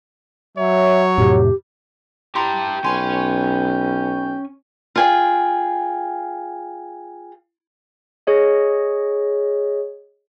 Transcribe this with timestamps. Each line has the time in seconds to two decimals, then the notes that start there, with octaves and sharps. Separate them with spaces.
0.57 F#3 C#5 E5
1.18 F2 A2 C3 G4
2.36 E4 G4 G5 A5 A#5 C6
2.84 B1 C#4 F4 B4 G#5 C6
4.96 F4 G#4 G5
8.27 G#4 C#5 D#5